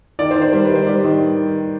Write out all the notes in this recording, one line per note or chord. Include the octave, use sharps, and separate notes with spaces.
D#3 D5
C5
D#3
C5
G3 C5
B4
D#3 C5
G3 D5
D#3